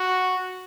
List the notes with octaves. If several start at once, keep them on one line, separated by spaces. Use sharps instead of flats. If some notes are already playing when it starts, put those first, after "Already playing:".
Already playing: F#4